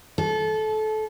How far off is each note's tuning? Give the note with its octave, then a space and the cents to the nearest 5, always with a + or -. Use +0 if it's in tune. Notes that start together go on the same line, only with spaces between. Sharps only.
A4 -25